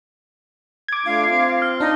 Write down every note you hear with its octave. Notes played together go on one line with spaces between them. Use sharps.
D6 G#6
A3 D4 F4 F5
C4 F4
F6
D4 D#4